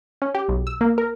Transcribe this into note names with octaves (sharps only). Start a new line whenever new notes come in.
C#4
G4
B1
E6
A#3
A#4